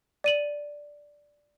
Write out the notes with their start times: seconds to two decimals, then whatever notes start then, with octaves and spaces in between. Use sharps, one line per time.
0.24 D5 D#7 F#7